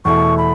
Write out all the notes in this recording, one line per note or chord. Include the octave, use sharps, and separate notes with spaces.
E2 B2 A3 E4 C#6
B5